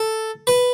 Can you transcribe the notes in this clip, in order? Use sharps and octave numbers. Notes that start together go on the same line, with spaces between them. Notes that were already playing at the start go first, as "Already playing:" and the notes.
Already playing: A4
B4